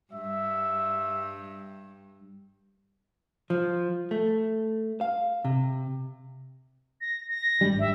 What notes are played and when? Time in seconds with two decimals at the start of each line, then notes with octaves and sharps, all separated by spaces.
0.13 G2 E5
3.50 F3
4.11 A3
5.01 F5
5.45 C3
7.01 A#6
7.29 A#6
7.61 G#1 G2 G3
7.79 E5